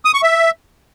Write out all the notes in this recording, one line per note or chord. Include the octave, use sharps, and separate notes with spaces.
D#6
C#6
E5